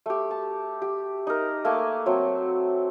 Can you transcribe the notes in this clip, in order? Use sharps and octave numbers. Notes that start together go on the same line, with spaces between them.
A3 G4
A5
G4
D#4 A#4
A3 A#3 G#5 D6
F#3 A3 C4